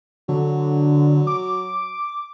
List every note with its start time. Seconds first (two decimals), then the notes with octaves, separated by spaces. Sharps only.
0.29 D3 F#3
1.27 D6